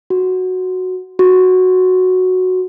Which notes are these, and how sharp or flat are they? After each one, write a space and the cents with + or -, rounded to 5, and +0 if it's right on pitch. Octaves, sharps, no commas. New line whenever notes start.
F#4 -5
F#4 -5